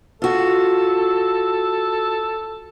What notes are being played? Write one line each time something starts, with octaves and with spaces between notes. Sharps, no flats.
F4 F#4 A4